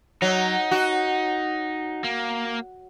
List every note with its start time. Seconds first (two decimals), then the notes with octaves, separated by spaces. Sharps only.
0.22 F#3 D#4
0.71 F#4
2.04 A#3